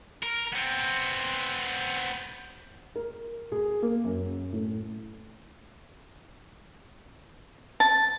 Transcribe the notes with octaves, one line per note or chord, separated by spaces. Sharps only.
A#4
B3 C4
A#4
G#4
A#3
F#2
A2
A5